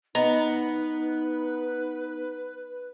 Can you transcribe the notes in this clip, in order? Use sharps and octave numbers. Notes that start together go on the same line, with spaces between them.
B3 D#4 B4 D#5 A#5